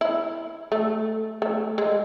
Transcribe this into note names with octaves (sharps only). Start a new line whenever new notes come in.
E4
A3
A3
G#3